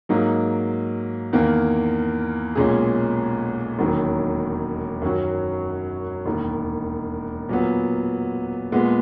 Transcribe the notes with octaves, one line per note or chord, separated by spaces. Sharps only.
G#2 F#3 A#3 D#4
E2 D#3 A#3
B1 A#2 G#3 C#4 G#4
E1 D#2 D#3 F#3 C#4
F#2 D#3 F#3 C#4 F#4
E1 D#2 D#3
A#2 F#3 B3
A#2 G#3 B3